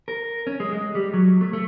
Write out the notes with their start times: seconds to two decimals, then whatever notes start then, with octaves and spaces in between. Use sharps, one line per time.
0.08 A#4
0.47 C#4
0.60 G#3
0.72 G#3
0.95 G3
1.14 F#3
1.41 A3
1.53 A3